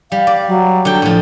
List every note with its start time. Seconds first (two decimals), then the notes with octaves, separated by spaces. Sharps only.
0.12 G3 F5
0.27 D5
0.48 F#3
0.85 D3 G5
1.02 A2 F3